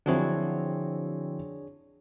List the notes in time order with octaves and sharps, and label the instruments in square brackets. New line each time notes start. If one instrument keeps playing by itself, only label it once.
[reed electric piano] D3 F3 E4 [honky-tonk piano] F#3 C4 [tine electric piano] D4 G#4 C#5